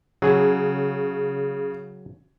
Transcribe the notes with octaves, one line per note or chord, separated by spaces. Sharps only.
C#3 F#3 G#4